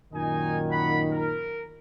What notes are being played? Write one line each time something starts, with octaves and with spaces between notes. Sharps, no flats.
F#2 A#2 D#3 D#4 D#5 G#5
F#5 B5
A#4